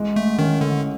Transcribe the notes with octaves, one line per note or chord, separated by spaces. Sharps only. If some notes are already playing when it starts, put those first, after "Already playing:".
Already playing: A1 G#3
A3
D#3 C#4
D3